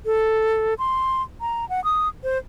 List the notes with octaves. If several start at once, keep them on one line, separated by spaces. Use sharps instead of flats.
A4
C6
A#5
F#5
D#6
C5